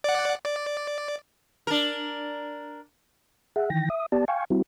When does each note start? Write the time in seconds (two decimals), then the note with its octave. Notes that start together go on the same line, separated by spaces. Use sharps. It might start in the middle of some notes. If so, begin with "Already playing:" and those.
0.04 D5 F#5
0.46 D5
1.67 D4 A#4
3.56 G#4 E5 F#5
3.70 D#3 E3 G5 A#6
3.90 E5 D#6
4.12 B3 G4 D5 A5
4.28 F5 G5 G#5 C#6
4.50 G3 C4 E4 F#4